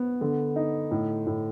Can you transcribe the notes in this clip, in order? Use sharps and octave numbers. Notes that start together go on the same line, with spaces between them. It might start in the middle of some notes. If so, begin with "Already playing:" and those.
Already playing: B3
D3
D#4
A2
A2